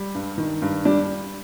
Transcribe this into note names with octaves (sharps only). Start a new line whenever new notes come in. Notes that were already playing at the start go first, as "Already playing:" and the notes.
Already playing: G3
G2
D#3
G2
G3 D4